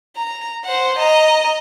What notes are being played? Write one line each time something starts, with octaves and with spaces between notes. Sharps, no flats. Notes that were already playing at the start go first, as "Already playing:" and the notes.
A#5
C5 F#5
D#5 A#5